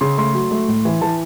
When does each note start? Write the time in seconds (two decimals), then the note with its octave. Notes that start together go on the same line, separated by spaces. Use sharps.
0.01 C#3 C6
0.18 A3 C6
0.34 F#3
0.51 A3
0.68 A2
0.85 E3
1.01 E3 A5